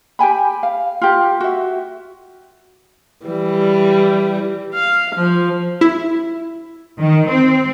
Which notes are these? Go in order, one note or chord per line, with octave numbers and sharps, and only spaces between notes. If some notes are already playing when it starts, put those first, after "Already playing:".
G4 G5 G#5 B5
F5
F4 G4
F#4 E5
E3 G3
F5
F3
E4
D#3
C4